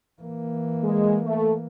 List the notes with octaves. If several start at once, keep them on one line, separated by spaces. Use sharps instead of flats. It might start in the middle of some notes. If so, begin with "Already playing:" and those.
E3 A#3
G#3
A3